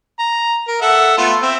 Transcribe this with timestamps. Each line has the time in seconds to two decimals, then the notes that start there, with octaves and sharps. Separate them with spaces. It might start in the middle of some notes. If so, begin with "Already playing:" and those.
0.19 A#5
0.68 A#4
0.82 A4 E5 F#5
1.18 A3 B3 F4
1.42 C4 E5